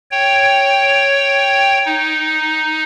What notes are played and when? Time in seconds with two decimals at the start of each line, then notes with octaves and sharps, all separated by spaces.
0.11 C#5 G5
1.85 D#4